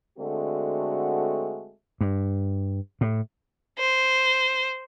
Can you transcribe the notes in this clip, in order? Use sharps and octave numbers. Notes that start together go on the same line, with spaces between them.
D3 G#3 A3 C4 F#4
G2
A2
C5